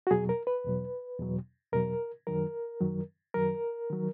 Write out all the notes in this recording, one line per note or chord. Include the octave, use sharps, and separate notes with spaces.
F#4
E2 B2 F#3 G#4
A#4
B4
E2 B2 F#3
E2 B2 F#3
E2 B2 F#3 A#4
F#2 D#3 F#3 A#4
F#2 D#3 F#3
F#2 D#3 F#3 A#4
D#3 F#3